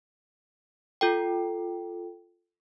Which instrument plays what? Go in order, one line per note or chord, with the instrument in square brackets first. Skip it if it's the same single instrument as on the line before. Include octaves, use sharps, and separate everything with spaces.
[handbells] F4 A4 G5